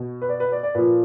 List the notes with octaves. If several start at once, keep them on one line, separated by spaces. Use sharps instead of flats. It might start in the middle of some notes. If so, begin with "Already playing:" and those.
Already playing: B2
B4
D5
B4
D5
D5
A#2 F3 B4